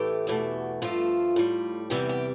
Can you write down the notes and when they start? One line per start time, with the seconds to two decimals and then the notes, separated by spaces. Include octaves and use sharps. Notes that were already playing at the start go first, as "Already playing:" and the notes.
Already playing: A2 E3 A3 G4
0.27 E2 B2 A3
0.82 G2 F3 A3 F4
1.36 A2 G3
1.90 E2 C3 E3 G3 G4
2.09 G4